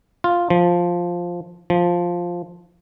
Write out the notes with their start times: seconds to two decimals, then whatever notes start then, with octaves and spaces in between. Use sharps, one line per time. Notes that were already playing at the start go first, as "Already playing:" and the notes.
0.24 F4
0.50 F3
1.70 F3